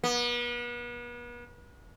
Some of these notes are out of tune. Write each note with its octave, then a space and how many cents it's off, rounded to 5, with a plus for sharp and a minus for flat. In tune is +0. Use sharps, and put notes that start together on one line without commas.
B3 -40